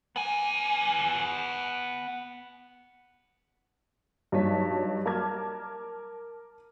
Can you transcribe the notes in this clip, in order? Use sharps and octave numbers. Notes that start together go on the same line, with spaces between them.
B3 G#5
G2 F#3 D#4 C#5 A5 B6
A#4 A5 D6 F6 G#6